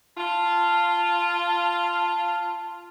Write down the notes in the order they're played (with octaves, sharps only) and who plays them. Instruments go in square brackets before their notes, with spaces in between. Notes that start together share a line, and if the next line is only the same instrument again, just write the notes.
[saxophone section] F4 [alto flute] A5